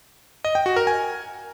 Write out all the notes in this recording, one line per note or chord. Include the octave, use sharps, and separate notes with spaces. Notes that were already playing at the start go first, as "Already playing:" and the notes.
D#5
G5
F#4
A#4
G#5